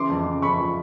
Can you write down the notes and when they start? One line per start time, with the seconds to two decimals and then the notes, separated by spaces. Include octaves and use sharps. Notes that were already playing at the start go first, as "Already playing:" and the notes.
Already playing: C#3 E3 C6 D6
0.10 F2
0.26 C#3
0.42 F2 B5 C#6
0.60 F3